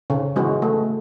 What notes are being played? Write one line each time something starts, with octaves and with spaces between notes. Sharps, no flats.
C#3
E3 G#3 C#4 F#4
A3